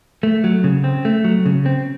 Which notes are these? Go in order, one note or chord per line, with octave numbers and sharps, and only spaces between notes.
A3
F#3
C#3
C4
A3
F#3
C#3
C4